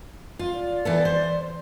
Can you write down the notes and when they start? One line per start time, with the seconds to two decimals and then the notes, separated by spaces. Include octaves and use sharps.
0.39 F4
0.53 D5
0.85 E3 B3 A4
1.05 C5